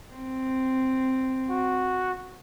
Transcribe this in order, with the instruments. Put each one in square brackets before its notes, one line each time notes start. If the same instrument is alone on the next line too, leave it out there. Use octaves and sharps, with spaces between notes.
[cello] C4
[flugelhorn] F#4